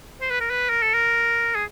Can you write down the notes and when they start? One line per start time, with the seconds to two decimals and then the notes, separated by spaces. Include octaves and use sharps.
0.21 C5
0.30 B4
0.40 A#4
0.50 B4
0.69 A#4
0.82 A4
0.94 A#4
1.55 G#4